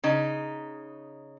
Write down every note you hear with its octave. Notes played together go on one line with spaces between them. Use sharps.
C#3 D#4